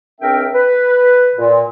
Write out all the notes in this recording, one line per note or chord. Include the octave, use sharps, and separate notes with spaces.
C#2 C4 D4 A#4 E5 G5
B4
A#2